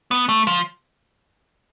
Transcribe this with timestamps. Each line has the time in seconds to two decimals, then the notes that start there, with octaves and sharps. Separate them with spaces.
0.11 B3
0.29 A3
0.47 F3